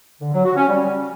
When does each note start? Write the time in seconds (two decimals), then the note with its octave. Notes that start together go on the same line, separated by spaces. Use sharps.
0.21 D3
0.33 F#3
0.45 F#4
0.56 C#4
0.68 G3